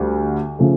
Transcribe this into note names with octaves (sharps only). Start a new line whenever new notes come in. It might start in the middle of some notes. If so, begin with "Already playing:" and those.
Already playing: D2 D3 G3
C#3 F3 A3